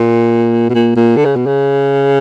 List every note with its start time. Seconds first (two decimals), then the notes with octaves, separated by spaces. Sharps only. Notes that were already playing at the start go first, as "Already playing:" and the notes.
Already playing: A#2
0.69 B2
0.74 A#2
0.96 A#2
1.16 D3
1.25 C#3
1.36 B2
1.46 C#3